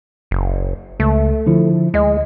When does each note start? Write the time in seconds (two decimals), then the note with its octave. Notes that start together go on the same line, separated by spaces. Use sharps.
0.31 F#1
1.00 C#2 A3
1.46 D3 F3 E4
1.94 D2 G#3 D#5